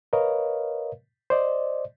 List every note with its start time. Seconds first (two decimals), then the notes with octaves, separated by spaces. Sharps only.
0.13 A#4 B4 C#5 D#5 F5
1.30 C5 D5 D#5